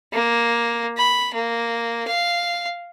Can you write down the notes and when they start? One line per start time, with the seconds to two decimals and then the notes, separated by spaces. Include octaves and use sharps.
0.13 A#3
0.97 B5
1.34 A#3
2.07 F5